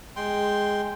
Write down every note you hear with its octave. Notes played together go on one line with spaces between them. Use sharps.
G#3 G5 C6